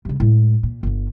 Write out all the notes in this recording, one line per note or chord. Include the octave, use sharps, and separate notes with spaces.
G2 C#3
A2 G#3
A#2
G1 D3